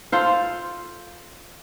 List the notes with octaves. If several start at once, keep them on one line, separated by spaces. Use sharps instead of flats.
F4 A4 C5 F5